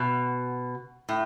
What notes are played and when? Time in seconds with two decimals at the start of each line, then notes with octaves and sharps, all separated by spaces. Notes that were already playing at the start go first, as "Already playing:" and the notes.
Already playing: B2
1.09 A2